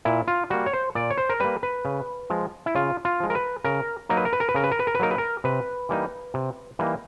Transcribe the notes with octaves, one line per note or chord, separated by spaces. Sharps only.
A#2 E4
F4
G3 A#3 F#4
C#5
C5
A#2 D5
C#5
C5
A#4
G3 A#3 B4
B4
C#3
F3 G#3
E4
C#3 F4
F4
F3 G#3
A#4
B4
C#3 A#4
F#3 A#3 D#4 A#4
B4
A#4
B4
A#4
B4
C#3 A#4
B4
A#4
B4
A#4
B4
F#3 A#3 D#4 A#4
B4
A#4
C3 B4
E3 G3 A#3 D#4
C3
E3 G3 A#3 D#4